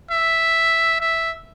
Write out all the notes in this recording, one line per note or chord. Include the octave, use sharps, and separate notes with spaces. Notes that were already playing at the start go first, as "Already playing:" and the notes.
E5
E5